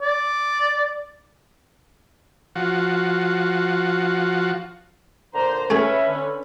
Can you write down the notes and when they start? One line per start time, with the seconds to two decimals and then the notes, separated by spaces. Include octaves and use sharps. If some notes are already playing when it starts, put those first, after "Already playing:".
0.01 D5
2.55 F3 F#4
5.34 A#2 D3 C5 A#5
5.70 A3 C#4 G#4 B4 E5
6.07 D3